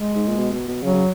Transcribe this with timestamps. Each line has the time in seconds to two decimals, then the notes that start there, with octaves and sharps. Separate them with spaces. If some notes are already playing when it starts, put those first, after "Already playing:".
Already playing: G#3
0.15 G#2
0.27 A#2
0.38 B2
0.52 B2
0.68 B2
0.83 C#3 F#3
0.94 C#3